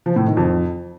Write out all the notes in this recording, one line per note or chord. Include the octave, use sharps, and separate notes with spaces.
F3
A2
D#3
F2